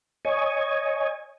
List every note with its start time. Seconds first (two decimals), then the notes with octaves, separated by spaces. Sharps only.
0.25 C#5 D#5 G#5